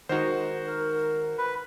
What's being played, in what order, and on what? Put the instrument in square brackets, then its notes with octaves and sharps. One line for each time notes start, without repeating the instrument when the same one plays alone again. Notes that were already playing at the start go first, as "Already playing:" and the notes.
[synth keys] D#3 G#3 D#4 [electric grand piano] F#4 C5 [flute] F#5
[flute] A#4
[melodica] B4